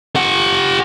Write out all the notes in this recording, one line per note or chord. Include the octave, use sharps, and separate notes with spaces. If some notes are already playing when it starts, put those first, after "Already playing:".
G4 F#5